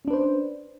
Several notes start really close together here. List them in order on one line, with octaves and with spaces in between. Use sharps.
C#4 D4 B4 C5